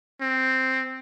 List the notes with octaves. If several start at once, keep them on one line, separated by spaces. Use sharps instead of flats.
C4